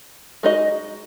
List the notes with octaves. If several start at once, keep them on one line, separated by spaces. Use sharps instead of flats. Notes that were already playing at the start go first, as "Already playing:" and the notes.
G#3 D#4 F#4 D#5